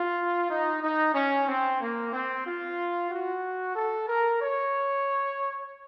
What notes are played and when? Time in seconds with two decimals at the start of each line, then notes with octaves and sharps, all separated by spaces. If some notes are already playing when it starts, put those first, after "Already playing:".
Already playing: F4
0.50 D#4
0.83 D#4
1.15 C#4
1.48 C4
1.80 A#3
2.13 C4
2.45 F4
3.11 F#4
3.76 A4
4.08 A#4
4.41 C#5